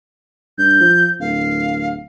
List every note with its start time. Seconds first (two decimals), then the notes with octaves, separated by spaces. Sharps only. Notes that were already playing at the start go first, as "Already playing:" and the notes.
0.58 G2 G6
0.81 F3
1.20 D1 F5